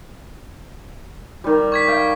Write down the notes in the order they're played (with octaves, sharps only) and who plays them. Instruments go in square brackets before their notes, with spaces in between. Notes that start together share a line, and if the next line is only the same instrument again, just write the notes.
[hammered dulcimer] D#3 G3
[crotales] C#6 G#6 B6
[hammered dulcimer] F5 G5